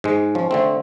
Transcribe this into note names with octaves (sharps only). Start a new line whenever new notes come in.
G#2 G#3
F3 C#4
D3 A3 C4